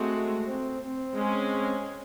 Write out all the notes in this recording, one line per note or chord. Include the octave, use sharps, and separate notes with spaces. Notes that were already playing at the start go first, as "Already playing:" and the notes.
Already playing: G#3 A3 C4 F#4
C4
C4
G#3 C#4 G#4